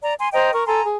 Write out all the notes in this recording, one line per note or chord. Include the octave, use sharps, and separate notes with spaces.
D5 A#5
G#5 C6
C5 D#5 G5 A#5
A#4 C#6
A4 G#5 A#5 C6
G#4